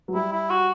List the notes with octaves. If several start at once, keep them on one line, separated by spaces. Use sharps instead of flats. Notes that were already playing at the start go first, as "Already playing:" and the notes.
F#3
G3 E4
E4
F#4